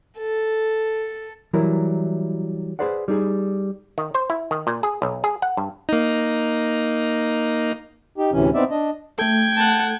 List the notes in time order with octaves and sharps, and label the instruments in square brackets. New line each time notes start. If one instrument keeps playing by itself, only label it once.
[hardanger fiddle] A4
[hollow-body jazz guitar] E3 F#3 G3 E4 A#4
G#4 B4 C5 D5 F#5
G3 D#4 G#4
[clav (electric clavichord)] D#3
C5
E4
D#3
A#2
G#4
B1
G#4
F#5
G2
[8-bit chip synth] A#3 D#4
[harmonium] D#4 G4
D2 A2 C3 E3 C#4
B3 C4 D#4 D5 E5
D4 D#5
[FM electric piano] A3 A4 [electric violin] G5 G#6
[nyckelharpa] F#5 A5